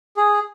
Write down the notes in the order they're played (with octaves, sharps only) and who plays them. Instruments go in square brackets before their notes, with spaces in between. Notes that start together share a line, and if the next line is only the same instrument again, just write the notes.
[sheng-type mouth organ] G#4